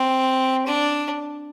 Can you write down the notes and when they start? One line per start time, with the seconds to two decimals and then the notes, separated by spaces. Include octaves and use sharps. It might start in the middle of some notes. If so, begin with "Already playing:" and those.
Already playing: C4
0.66 D4